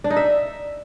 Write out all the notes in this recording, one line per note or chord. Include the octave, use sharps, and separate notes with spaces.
D4
D#4
E5